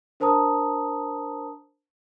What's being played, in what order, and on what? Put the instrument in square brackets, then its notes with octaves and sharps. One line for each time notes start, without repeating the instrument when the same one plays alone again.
[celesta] D4 A#4 C5 A5 A#5 D#6